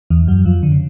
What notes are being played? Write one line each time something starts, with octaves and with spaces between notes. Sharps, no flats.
E2 E3
F#2 F#3
F2 F3
D3
C#3